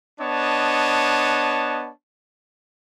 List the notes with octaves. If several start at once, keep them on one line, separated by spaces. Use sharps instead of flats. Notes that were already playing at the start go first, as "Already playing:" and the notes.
B3 D4 C#5 D#5 A5